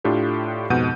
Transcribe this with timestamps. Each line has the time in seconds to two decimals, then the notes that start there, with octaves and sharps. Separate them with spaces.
0.04 A2 D4 F4 G4 A4
0.70 F2 G#2 B2 F#5 G6 D#7